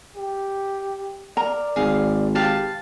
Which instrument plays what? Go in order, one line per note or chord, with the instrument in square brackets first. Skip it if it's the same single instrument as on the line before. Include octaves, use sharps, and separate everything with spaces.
[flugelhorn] G4
[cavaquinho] A#4 [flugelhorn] D5 [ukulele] A#5
[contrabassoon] G#1 [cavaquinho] G#4 F5
[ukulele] G4 [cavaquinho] B4 F5 A5